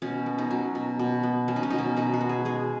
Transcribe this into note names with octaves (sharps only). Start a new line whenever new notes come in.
B2 C#4
B3
D#4
F#3 C#4
B2
B2
B3
F#3 C#4
D#4
C#4
B2 D#4
C#4
B2 D#4
F#4
B3
G#4
G#3 G#4